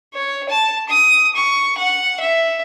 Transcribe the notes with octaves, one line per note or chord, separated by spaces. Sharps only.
C#5
A5
D#6
C#6
F#5
E5